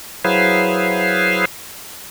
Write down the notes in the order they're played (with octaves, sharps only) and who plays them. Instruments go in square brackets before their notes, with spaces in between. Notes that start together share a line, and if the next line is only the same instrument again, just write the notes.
[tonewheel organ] F#3 E4 G#4 B4 C5 F5